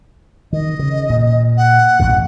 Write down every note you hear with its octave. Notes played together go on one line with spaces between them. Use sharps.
D#3 D#5
C#3
A#2
F#5
A1 F#2 B2